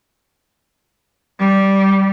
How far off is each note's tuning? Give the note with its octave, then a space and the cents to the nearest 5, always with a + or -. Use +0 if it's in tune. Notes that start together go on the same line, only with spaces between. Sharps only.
G3 -10